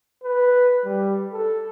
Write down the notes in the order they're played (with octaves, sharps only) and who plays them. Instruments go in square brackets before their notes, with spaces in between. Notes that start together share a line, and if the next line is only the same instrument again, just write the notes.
[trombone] B4
G3
A4